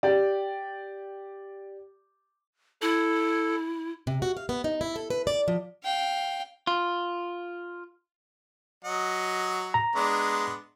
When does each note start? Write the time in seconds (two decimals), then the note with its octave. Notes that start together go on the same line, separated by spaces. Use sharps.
0.03 G4 D5
2.82 E4 A4
4.07 C3
4.22 F#4
4.37 F5
4.49 B3
4.64 D#4
4.81 E4
4.96 A4
5.10 B4
5.27 D5
5.48 F3
5.84 F5 G5
6.67 F4
8.85 F#3 D#5 F#5
9.74 A#5
9.96 G#3 B3 D4